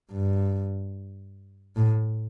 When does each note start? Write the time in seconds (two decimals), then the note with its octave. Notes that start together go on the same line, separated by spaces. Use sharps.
0.11 G2
1.76 A2